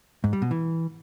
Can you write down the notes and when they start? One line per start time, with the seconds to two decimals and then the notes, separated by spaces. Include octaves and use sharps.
0.24 G#2
0.33 G3
0.42 B2
0.51 E3